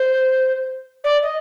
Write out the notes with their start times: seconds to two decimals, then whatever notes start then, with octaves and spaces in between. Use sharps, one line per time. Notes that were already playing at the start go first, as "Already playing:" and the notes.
Already playing: C5
1.04 D5
1.22 D#5